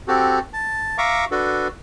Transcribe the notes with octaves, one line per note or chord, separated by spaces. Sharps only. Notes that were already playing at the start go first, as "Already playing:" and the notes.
C4 F#4 G4 A4
A5
E5 F5 A#5 C#6 D6
D4 F#4 A4 B4